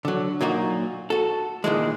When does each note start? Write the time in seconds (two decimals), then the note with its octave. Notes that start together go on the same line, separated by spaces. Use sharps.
0.05 D3 F#3
0.41 A#2 F#3 A#3 D#4 F#4
1.10 F#4 A4
1.64 A#2 D#3 E3 G#3